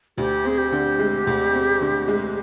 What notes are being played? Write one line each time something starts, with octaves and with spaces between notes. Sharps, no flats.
D2 G4
C4 G#4
G4
D3
G#3
D2
C4
D3
G#3